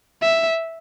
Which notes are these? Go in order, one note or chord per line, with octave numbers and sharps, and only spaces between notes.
E5